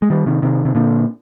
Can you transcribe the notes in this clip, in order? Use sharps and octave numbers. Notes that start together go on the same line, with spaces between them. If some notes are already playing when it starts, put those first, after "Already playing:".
G#3
D#3 G3
C3 D#3
C3 D#3
C3
A#2 D3